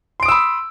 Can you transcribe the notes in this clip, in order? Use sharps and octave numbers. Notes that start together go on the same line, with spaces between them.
B5 C6 D#6 E6 D7